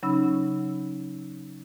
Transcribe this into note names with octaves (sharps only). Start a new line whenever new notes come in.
C#3 F#3 C#4 D#4 B5 E6